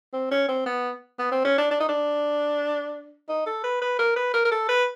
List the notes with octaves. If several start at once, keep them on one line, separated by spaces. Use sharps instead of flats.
C4
C#4
C4
B3
B3
C4
C#4
D4
D4
D#4
D4
D#4
A4
B4
B4
A#4
B4
A#4
A#4
A4
B4